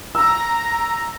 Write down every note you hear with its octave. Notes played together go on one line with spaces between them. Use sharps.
A#5 E6